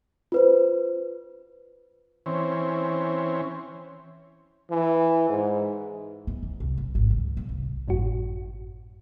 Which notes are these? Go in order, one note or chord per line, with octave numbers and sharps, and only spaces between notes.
F4 B4 C5
E3 C4 C#4
E3
G#2
B3
E2
C2
E1
G#1
C#2
A#2
C2
G#1 F#2 A2 F#4